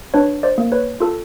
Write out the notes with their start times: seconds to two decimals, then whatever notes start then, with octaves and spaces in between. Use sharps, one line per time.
0.14 D4 B4 C#5
0.43 C5 D5
0.58 A#3
0.72 B4 C#5
1.00 F4 A4